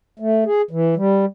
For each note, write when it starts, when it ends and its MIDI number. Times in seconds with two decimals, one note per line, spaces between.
0.19 0.44 57
0.46 0.62 68
0.71 0.95 52
0.97 1.25 55